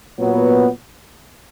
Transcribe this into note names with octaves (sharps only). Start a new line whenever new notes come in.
A#2 F#3 B3